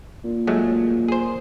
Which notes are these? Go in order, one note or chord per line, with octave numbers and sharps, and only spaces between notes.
A#2
F#3 G#3 A3
G#4 C5